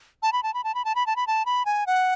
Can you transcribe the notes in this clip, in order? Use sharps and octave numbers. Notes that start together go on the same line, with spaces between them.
A5
B5
A5
B5
A5
B5
A5
B5
A5
B5
A5
B5
G#5
F#5